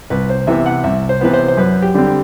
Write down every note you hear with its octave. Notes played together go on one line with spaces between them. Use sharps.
C2 B4
C5
C3 E3 B3 E5
F#5
C2 E5
C5
C3 E3 B3 B4
C5
C5
F#2 B4
G4
D3 G3 C4
G4